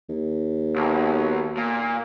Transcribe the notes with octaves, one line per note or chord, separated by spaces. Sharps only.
D#2
B1
A#2